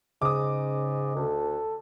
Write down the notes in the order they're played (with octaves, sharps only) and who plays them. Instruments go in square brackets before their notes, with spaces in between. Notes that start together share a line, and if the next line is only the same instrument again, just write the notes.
[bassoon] G#2 [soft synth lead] C#3 [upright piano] D6 D#6
[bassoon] D2 [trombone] A4